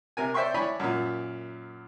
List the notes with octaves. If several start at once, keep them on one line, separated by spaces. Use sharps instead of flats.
C3 A#4 G#5
C5 D5 E5 G5 C6 C#6
D4 E4 C#5 G#5 B5
F#2 A#2